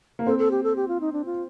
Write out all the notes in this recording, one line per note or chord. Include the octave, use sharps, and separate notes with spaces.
A#3
C4 A4
A4
G4
A4
G4
F4
D#4
D4
F4